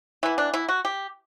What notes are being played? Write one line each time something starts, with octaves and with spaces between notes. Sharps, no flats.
E3 B3 E4
D4
E4
F#4
G4